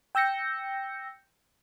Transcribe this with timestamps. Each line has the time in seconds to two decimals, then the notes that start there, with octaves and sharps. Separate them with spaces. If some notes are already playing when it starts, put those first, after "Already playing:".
0.15 G5 E6 G6 A#6 C#7